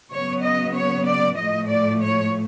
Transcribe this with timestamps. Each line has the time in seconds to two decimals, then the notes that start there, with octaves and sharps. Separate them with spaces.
0.10 C#3 F#3 B3 C#5
0.42 D#5
0.74 C#5
1.05 D5
1.37 A2 F3 A3 D#5
1.68 D5
2.01 C#5